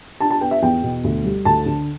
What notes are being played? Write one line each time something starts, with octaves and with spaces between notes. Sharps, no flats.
D4 A5
A5
B3 G5
E5
E2 G5
B2
D2
G3
D2 A5
D3